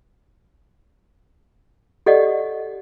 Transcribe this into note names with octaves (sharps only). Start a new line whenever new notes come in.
G4 A4 D5 D#5 F#5